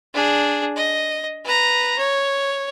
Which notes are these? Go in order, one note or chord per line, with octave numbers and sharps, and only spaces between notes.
D4 G#4
D#5
B4 A#5
C#5